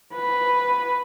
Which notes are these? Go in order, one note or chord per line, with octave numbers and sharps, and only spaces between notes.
B4